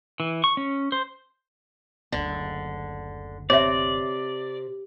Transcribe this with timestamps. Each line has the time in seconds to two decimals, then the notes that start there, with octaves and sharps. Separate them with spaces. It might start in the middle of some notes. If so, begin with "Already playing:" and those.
0.20 E3
0.44 C#6
0.57 C#4
0.92 C5
2.12 F#1 D2 D3
3.50 C3 C#5 D5 E5